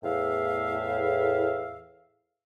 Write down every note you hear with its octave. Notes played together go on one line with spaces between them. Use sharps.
E2 A2 E5 F5